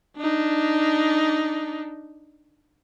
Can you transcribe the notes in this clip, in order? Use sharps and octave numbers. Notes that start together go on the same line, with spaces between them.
D4 D#4